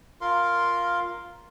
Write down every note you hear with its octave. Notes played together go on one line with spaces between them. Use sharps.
F4 A#4 F5 C6